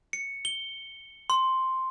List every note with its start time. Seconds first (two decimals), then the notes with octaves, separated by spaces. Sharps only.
0.13 C#7
0.45 G7
1.30 C6